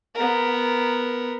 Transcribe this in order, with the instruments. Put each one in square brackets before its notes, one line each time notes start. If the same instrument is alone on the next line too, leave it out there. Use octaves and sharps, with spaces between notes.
[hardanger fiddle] B3 A#4